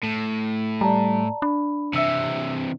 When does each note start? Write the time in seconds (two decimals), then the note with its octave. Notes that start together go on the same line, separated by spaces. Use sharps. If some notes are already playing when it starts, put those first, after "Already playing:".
0.03 A2
0.81 G3 D5 A5 A#5
1.42 D4 B5
1.94 C3 E3 E5 E6 C#7